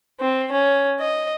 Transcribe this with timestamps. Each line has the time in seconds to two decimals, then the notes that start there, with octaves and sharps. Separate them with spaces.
0.20 C4
0.51 C#4
0.98 D#5